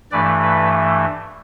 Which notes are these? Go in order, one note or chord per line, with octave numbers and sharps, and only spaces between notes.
G2 E3 A3 B4 D5
B4